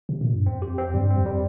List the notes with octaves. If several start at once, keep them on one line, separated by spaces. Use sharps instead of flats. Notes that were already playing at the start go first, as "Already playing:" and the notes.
C3
A#2
G2
F2 C4
G4
C4
G2 G3
C4
F2
G3